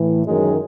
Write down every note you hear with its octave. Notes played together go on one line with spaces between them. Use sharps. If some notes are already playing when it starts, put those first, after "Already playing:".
Already playing: A2 E3
F#2 D#3 F#3 G#3